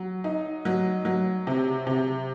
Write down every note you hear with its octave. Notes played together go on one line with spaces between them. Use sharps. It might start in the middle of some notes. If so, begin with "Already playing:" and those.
Already playing: F#3
D#4
F#3
F#3
C3
C3